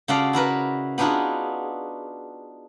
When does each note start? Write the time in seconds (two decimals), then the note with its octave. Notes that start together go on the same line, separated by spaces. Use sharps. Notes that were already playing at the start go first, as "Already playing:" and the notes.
0.08 C#3 F4 F#4 A4 D5 F5
0.33 E4 F#4 A#4 B4
0.98 B3 D4 D#4 F4 F#4 G#4